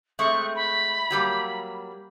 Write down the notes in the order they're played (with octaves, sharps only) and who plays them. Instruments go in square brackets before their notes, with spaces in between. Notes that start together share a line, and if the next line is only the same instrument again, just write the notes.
[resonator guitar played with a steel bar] G#3 A3 C4 [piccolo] C#6
[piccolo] B5
[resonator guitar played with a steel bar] F#3 G3 A#3